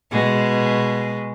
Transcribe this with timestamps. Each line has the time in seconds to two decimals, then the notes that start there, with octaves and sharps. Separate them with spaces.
0.11 B2 G#3